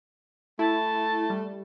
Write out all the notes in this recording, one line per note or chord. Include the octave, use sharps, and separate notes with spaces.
A3 E4 A5
G3